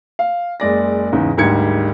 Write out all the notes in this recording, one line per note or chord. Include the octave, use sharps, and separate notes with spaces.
F5
F#1 G#3 D5 A#6
E2 G#2 C#3
G#1 D2 G#2 G3 G#6 C#7